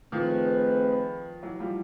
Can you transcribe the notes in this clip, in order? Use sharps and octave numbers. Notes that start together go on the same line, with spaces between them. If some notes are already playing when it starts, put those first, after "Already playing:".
D#3 F3 A3 C4 D#4 G#4 B4
E3 F#3
F3 G3